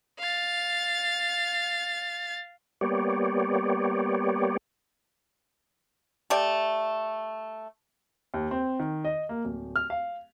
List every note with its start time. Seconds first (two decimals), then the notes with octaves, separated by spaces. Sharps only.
0.20 F5 A6
2.81 G3 A#3 B3 G4 C#5 D5
6.30 A3 G4 D5
8.34 D#2
8.51 C4
8.79 D#3
9.05 D#5
9.29 A#3
9.45 D1
9.76 F6
9.90 F5